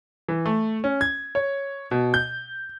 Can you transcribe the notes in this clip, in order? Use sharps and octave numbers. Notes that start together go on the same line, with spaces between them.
E3
A3
C#4
G#6
C#5
B2
G6